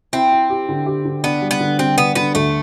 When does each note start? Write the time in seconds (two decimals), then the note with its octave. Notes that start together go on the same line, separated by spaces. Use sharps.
0.13 C4 E4
0.32 E4
0.50 G4
0.69 D3
0.86 G4
1.05 D3
1.24 B3 D4
1.42 G3
1.51 B3
1.60 D3
1.79 G3 C4
1.97 B3 D4
2.15 D3 B3
2.35 D2 A3